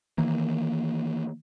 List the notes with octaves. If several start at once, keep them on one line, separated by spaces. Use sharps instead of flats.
D#3 E3 A#3